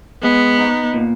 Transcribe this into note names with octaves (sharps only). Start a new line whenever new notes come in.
G#3 B3
D#4
A#2